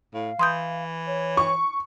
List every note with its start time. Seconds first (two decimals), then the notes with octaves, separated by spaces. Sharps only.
0.14 A2 F5
0.39 E3 C6 D#6 G6
1.06 C#5
1.37 C#6